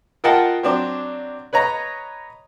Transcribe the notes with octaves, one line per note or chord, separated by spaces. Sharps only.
F4 A#4 D#5 F#5 G5 A5
F#3 C4 D4
B4 C#5 D#5 A#5